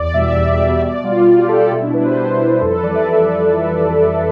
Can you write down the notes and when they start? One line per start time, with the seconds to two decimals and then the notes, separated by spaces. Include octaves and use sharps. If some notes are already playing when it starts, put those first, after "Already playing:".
Already playing: E2 D5
0.14 B2 G3 E5
0.36 E2 E5
0.59 B2 G3
0.82 B2 D5
1.04 G3 F4
1.27 B2 F4
1.38 G4
1.48 G3 A4
1.71 B2 E4
1.83 D4
1.94 G3 B4
2.05 C5
2.16 B2 C5
2.39 G3
2.61 F2 A4
2.72 B4
2.83 E3 G3 D5
2.95 E5